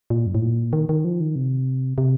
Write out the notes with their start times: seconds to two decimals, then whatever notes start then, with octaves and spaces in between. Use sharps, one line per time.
0.10 A#2
0.26 F#2
0.35 A2
0.42 A#2
0.73 D#3
0.89 D#3
1.05 F3
1.20 D#3
1.36 C3
1.98 C3